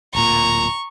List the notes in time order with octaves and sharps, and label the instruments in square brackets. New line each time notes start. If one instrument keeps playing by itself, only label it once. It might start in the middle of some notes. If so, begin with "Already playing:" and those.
[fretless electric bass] D1 A#2 [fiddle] A#5 [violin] C#6